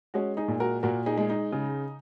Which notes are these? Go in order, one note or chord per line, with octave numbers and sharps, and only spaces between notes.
G#3 C#4 F#4
D#4 G#4
A#2
F#4 A#4
A#2 F#4 A#4
D#4 G#4
G#3
D#4
C#3